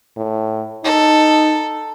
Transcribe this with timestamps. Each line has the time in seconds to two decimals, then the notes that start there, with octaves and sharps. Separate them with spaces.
0.17 A2
0.84 D#4 A4